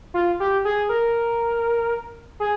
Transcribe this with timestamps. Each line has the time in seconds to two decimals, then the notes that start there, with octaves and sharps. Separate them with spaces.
0.14 F4
0.40 G4
0.65 G#4
0.89 A#4
2.40 G#4